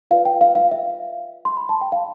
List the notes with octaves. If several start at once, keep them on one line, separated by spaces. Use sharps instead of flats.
F4 B4 D5 F5
G5
F5
F5
E5
C6
B5
A5
G5
F5